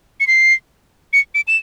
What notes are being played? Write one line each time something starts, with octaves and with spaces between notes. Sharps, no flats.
C#7
C7
C#7
D7
E7